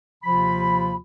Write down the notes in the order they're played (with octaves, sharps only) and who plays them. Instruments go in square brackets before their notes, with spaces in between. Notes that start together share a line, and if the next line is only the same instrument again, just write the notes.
[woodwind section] D#2 C3 F3 F4 B5